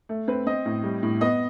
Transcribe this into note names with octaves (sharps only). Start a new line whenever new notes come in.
A3
C4 B4
C4 D#5
A2
G3
A2
B3 D#5